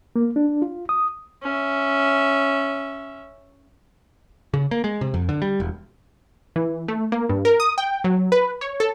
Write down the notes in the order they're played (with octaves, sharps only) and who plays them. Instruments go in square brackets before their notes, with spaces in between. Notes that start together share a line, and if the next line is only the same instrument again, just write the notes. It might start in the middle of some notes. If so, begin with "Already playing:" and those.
[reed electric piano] A#3
D4
F4
D#6
[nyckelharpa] C#4 E5
[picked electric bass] C#3
A#3
G#3
C3
F2
D3
G3
E1
[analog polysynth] E3
A3
A#3
G2
A#4
D#6
G5
F#3
B4
C#5
A4